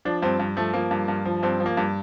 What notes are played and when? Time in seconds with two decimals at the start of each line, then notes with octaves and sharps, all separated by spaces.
0.05 F3 D4
0.22 G2 C4
0.39 G2
0.57 F3 A3
0.74 F3 A#3
0.91 G2
1.08 G2
1.25 F3
1.43 G2 C4
1.60 F3
1.66 A#3
1.77 G2